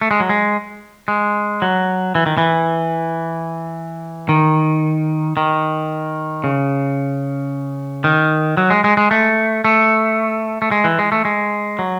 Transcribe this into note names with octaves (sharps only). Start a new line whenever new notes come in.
A3
G#3
F#3
G#3
G#3
F#3
E3
D#3
E3
D#3
D#3
C#3
D#3
F#3
G#3
G#3
G#3
A3
A3
A3
G#3
E3
G#3
A3
G#3
F#3